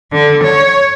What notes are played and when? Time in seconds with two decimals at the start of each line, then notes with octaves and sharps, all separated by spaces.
0.12 D3
0.44 C#5